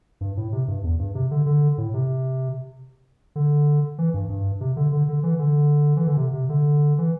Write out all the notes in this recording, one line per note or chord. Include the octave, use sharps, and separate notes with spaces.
G2
A2
C3
G2
E2
G2
C3
D3
D3
A2
C3
D3
E3
G2
G2
C3
D3
D3
D3
E3
D3
E3
D3
C3
C3
D3
E3